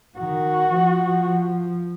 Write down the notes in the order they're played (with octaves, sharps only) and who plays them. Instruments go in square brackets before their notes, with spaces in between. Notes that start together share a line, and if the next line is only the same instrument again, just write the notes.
[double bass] D#3 [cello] F#4
[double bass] F3